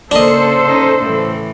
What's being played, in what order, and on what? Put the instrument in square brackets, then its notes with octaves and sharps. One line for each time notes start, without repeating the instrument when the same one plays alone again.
[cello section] C#3 A4 C5 [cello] A#3 [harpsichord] D4 D#5
[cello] C#4 D#4
A2 E3